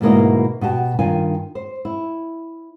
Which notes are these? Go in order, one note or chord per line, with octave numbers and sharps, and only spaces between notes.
D2 G#2 B2 A#3 E4 D#5
B2 F#4 G4 A5
G2 D#3 D4 F4 G#5
C5
E4